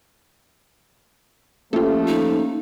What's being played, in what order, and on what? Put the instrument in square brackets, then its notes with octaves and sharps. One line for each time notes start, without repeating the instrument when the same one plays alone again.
[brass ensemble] F3 A3 [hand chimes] A#3 C#4 [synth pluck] F4 G4 A4
[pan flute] D#4